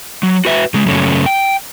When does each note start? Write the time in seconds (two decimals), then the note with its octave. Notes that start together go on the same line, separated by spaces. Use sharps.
0.23 F#3
0.45 F#4 B4 E5
0.74 C#3 G#3
0.86 F#2 C#3 A3 C#4
1.26 G5